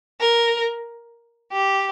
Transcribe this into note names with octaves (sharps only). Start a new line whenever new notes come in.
A#4
G4